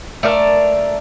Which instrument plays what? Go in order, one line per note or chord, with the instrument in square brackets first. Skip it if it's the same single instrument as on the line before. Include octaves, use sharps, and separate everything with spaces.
[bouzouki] A3 D4 A#4